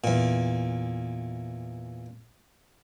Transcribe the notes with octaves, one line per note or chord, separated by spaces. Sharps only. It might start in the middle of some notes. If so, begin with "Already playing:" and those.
E2 A#2